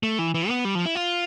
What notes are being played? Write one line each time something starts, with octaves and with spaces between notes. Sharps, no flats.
A3
E3
E3
B3
G3
F3
E4
F4